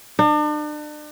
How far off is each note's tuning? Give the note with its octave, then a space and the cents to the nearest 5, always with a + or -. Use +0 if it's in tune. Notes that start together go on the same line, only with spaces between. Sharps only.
D4 +40